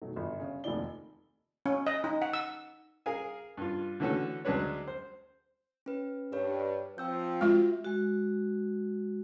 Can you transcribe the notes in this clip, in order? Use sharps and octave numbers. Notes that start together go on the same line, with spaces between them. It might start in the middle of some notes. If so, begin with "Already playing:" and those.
B2 D#3 F#3 A3
G1
C#3
F1 D#2 D#3 D#4 D5 G7
C#4
D#5
D#4
F#5
E6
G#4 A#4 F5 G#5
G2 F4
D3 E3 A3 C#4 F#4 A4
D2 F#3 G#3 D4 B4 C#5
C5
C#4 B4
G2 A#4 B4 C#5
F3 C4 G5 E6 G6
G#3 F4 F#4 E5
G#3 F#4